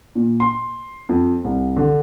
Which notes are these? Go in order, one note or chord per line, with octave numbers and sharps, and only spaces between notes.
A#2
C6
F2
C2
D3